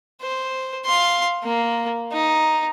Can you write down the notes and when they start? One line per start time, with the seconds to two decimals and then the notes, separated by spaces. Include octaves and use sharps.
0.22 C5
0.85 F5 C6
1.43 A#3
2.12 D#4